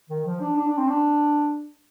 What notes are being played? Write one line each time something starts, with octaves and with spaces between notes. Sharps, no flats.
D#3
F3
D4
D4
D4
C4
D4